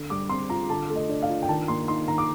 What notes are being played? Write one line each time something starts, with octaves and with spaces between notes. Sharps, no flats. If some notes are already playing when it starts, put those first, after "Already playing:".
Already playing: D3
G3 D6
C4 C6
F4 A#5
D3 A5
A3
D#5
D4
F5
F4
G5
D#3 A5
A#3 C6
D#4 C6
D#3 A#5
D6